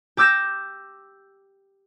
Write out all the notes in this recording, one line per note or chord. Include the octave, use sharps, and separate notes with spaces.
G4 D6 E6 G6 A#6 E7